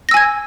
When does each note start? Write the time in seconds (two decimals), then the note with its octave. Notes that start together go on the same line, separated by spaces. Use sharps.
0.09 A#6
0.11 E6
0.14 G#5
0.17 G#6